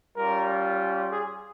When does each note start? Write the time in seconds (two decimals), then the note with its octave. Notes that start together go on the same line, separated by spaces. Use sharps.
0.17 G3 C#4 F4 A#4
1.11 G#4